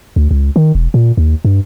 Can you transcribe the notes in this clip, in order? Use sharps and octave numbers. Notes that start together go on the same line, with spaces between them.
D2
C#2
D#3
E1
A#2
D#2
G2